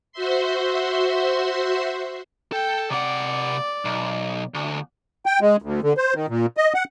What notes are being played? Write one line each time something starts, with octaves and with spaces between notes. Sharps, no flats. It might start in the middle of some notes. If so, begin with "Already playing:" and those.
F#4 C5 E5 C6
A4 G5
C3 D5 F#5
B1
D2
G5
G#3
D2
D3
C5
D#3
A#2
D#5
F#5